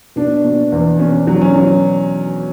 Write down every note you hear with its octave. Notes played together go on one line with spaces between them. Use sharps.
B2 D4
B2
E2
B2 C#4
F#3
C#4
F#3